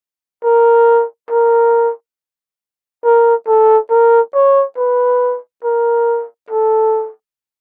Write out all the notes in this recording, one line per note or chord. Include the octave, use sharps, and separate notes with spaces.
A#4
A#4
A#4
A4
A#4
C#5
B4
A#4
A4